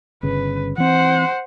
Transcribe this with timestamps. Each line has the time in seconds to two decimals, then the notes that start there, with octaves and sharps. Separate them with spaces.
0.23 G1 C#3 B4
0.78 E3 C4 C5 F#5